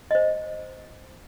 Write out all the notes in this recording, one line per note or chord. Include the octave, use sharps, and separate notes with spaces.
C5 D#5